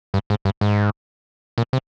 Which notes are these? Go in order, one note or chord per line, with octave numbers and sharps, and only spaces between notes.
G2
G#2
G2
G#2
A#2
C3